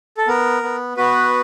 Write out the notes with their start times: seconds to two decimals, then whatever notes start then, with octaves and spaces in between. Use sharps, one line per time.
0.18 A4
0.27 B3 A#4
0.63 B3
0.97 B3 F#4 B4